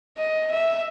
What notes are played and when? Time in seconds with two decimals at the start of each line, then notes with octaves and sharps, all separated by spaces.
0.18 D#5
0.51 E5